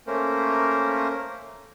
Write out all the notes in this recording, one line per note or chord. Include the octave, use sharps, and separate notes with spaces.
A3 A#3 C#4 A#4 C5